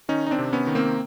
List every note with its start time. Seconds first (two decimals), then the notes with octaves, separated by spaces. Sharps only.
0.09 D#3 C#4 D#4
0.26 D#4
0.31 C4 D4
0.39 C3
0.53 B3 C#4
0.67 D#3
0.75 A#3 C4